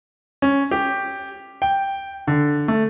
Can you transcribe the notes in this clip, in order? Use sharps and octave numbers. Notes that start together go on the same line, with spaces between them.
C#4
G4
G5
D3
A3